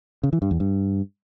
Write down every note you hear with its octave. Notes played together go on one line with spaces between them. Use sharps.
C#3
E3
G2
E2
G2